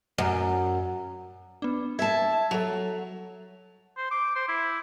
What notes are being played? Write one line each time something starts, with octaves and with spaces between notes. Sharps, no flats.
F#2
B3 D4
E5 A5 G#6
F#3 A4 F7
C5
D6
C5
E4